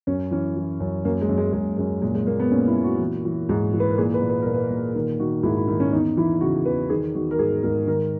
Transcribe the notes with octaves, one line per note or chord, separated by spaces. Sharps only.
F#2 C#4
E3 C#4
E3
F#2
F#2 A#3
G#3
F#2
G#3
F#2 G#3
F#2 G#3
A#2 G#3
G#3
A#2 A#3
B3
A#2 C#4
E4
A#2
F#4
E3
E3
G#2
E3
B4
A#4
A#2 G#4
B4
A#2
B4
A#2 A#4
B4
A#2
D#3 A#4
D#3 F#4
G#2 E4
E4
D#3 E4
C#4
E2 D#4
E3 E4
C#3 F#4
E2 B4
D#3 G#4
D#3 F#4
A#4
G#2 G#4
G#2 A#4
D#3 A#4